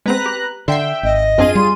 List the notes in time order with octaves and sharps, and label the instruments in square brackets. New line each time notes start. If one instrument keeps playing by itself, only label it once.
[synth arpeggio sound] G#3 B3 C4 [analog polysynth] B4 A#5 F#6
[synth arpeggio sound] G4
[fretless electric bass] D3 [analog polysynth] E5 G5 [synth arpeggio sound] C6 C7
[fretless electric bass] G#1 [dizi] D#5
[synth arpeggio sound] F#2 C4 D4 [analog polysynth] F4 G#4 D#7
[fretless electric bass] G3 [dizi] C6